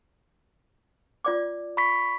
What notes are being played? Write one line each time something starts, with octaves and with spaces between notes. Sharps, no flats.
F4 D5 D6
B5 C#6 B6